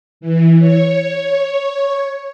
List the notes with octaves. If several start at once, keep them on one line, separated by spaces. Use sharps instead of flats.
E3
C#5